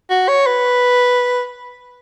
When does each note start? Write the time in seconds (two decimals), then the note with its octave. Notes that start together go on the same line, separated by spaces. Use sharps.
0.10 F#4
0.28 C#5
0.47 B4